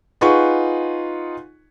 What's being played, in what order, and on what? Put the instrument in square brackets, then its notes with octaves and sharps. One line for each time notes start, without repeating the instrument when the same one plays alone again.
[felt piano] D#4 F4 G#4 B4 F#5 C#6